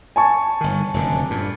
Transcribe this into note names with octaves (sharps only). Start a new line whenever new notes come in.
G#5 A5 C#6
G1 D#3
F1 F#2 D3
G2 A#2